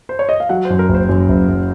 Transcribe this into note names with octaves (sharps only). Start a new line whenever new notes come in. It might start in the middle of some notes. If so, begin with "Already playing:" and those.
C5
C#5
D#5
F5
F#3 F#5
C5
F#2
A#4
F#1
C5
F#2
F#1
F#1